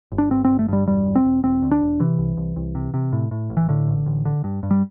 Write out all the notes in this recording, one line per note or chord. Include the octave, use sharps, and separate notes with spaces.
G1
D4
G2 C4
G1 C4
A3
G2 G3
E1 G3
E1
C4
E1
E1 C4
D2
D4
E1
C3 E3
C2
C2
C2
C3
C3
A2
A2
A1
E3
A2 D3
A1
A1
D3
G2
G2
G3